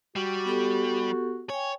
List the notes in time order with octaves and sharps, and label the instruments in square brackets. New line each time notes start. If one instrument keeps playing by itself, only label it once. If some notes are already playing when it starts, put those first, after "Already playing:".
[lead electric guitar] G3 [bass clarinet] F#4
[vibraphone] B3 G4 A4
[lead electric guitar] C#5 [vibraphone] G5 G#5